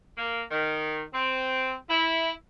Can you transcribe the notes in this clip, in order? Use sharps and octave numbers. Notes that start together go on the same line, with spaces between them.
A#3
D#3
C4
E4